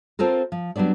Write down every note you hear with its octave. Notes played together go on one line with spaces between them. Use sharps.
C4 F4 A4 A#4
F3
F#3 G3 B3 D4 D5